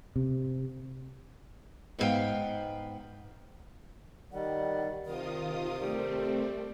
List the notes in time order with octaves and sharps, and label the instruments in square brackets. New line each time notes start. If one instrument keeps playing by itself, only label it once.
[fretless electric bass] C3
[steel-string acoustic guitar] G#2 B3 F4 G#4 F5 G5
[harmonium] D#3 G3 [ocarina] F#5
[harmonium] C3 [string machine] D#3 F4 D#6 [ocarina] A#4
[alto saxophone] G3 [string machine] A3 C4